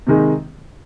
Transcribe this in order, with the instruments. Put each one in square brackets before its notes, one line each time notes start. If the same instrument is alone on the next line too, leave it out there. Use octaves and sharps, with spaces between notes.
[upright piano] C3 D#3 G#3 D#4